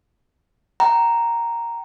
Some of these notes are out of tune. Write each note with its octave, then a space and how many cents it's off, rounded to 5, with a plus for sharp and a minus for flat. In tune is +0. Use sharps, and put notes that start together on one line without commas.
G5 -35 A#5 +0